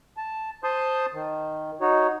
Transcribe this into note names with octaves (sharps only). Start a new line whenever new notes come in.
A5
C5 A5 C6 D#6 G6
D#3
D#4 F#4 C#5